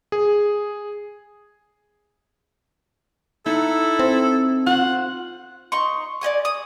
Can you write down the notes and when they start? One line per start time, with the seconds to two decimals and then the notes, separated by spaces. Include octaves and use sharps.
0.12 G#4
3.46 D#4 E4 A4 F#5 B5
3.99 C4
4.66 F4 C5 F#5
5.72 D#4 C6 C#6
6.21 D5 D#5 G#5 C#6
6.45 D#6